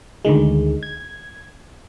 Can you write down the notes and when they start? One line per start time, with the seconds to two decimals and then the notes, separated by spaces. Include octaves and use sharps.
0.25 D2 D3 D#3 G#3
0.83 G#6